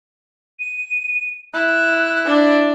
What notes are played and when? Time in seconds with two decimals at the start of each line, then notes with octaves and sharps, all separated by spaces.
0.60 D#7
1.54 E4 F#6
2.25 D4 D5